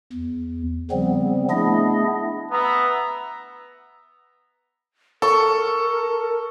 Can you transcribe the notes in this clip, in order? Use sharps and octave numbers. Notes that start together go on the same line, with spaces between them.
E2
C#3 F3 G3 B3 C4
A3 B3 D4 E4 G#4 D#5
B3 E5 A#5
A4 A#4 C#6